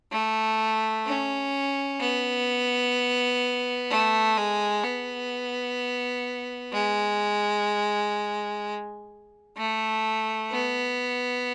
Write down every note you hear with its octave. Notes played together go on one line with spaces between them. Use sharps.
A3
C#4
B3
A3
G#3
B3
G#3
A3
B3